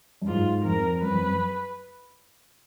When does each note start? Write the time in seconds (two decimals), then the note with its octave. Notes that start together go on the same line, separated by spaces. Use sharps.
0.22 F#2
0.27 G#2 F4
0.64 F2 A#4
1.02 F#2 B4
1.11 F2
1.19 F#2